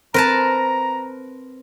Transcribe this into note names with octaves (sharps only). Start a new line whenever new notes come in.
C4 A#4 B4 A5 A#5